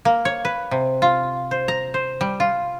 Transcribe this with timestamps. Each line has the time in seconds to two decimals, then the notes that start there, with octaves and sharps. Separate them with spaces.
0.05 A#3
0.25 C#5
0.45 B4
0.71 C3
1.02 F4
1.51 C5
1.68 A#5
1.94 C5
2.21 G3
2.40 F4